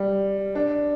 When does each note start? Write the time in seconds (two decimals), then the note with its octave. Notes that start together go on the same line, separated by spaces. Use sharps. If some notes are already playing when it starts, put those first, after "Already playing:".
Already playing: G3
0.55 D4